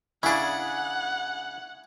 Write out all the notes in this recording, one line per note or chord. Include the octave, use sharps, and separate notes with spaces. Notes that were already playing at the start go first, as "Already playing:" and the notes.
C#3 D4 E4 G#4 F#5